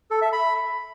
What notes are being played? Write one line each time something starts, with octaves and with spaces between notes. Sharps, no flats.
A4
E5
B5